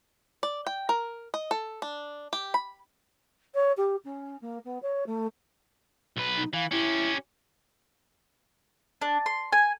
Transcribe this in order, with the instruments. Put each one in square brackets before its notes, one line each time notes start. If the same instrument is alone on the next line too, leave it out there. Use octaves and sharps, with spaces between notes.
[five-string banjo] D5
G5
A#4
D#5
A4
D4
G4
B5
[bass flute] C#5
G4
C#4
A#3
B3
C#5
A3
[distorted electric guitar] B1 B4
[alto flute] D#4
[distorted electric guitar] E3 [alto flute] F5
[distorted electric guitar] C#4 G4 [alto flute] E4
[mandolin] D4
C6
G#5